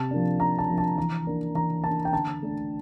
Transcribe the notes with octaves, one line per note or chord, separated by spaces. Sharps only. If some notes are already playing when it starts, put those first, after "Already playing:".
Already playing: C3 A5
F3 A#3 D4
C3 A#5
A5
F3 A#3 D4
A5
E3 A#5
A#3 D4
E3 A#5
A#3 D4 A5
G5
D3 A5
A3 D4